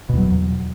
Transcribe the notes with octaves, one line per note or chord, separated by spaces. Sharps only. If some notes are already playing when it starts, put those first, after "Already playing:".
E2 B2 F#3